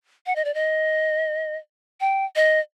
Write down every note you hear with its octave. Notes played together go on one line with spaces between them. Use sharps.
F#5
D#5
D5
D#5
G5
D#5